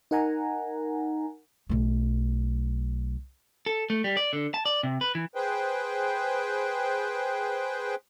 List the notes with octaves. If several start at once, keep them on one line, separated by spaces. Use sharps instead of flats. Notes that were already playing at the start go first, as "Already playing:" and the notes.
D#4 A#4 F#5 G#5 A#5
B1 A3
A4
A3
G3
D5
D3
A5
D5
C3
B4
E3
G#4 B4 C5 G5